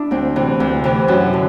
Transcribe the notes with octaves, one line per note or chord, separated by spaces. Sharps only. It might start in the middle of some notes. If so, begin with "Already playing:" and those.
Already playing: D4 E4
D2 C4
C3 E3 C4
D2
C3 E3
F#2
D3